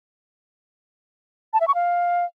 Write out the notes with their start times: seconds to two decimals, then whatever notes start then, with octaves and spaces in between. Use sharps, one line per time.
1.53 A5
1.61 E5
1.68 C#6
1.75 F5